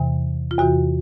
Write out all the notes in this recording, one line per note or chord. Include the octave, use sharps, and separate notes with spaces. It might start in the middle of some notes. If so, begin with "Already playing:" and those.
Already playing: E2 C3 E3
F4
E2 C3 E3 F#4